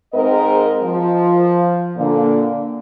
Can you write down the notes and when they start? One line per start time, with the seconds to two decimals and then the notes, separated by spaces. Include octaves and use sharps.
0.14 G#2 C4 G#4 A#4 D#5
0.83 F3
1.96 A#2 D3 A#3